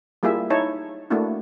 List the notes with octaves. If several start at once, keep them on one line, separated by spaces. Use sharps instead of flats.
G3 A#3 E4 F4 G#4 E5
D#4 E4 C#5 A5
A3 A#3 D4 E4 F#4